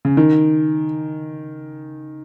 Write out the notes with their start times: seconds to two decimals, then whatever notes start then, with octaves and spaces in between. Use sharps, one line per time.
0.05 C#3
0.17 D#3